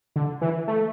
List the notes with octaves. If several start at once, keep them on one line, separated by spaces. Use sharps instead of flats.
D3
E3
A3